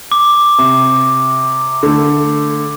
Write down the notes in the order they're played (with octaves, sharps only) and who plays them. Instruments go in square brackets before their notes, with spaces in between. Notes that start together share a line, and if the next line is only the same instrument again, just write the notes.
[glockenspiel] D6
[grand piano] C3
D3 A3